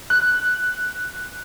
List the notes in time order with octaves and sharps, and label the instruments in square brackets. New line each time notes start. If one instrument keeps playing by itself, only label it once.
[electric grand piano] F#6